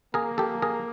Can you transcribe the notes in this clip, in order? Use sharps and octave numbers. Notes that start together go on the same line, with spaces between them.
A#3 G#4 A#4
G4 A4
G#4 A#4